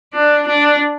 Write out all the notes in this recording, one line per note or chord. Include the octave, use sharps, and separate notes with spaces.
D4
D4